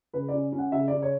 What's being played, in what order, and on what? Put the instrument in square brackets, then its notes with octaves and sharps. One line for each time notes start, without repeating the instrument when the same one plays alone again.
[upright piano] C#3 B4
C#4 D5
C#4
F#5
C#3 E5
C#3 D5
C#5